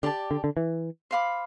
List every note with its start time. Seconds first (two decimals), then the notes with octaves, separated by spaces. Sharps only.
0.03 D3 G4 D5 A5
0.31 D3
0.44 D3
0.57 E3
1.11 C5 F5 B5 D6